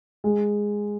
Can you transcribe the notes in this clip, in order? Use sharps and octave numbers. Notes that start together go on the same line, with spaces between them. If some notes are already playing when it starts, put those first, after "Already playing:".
G#3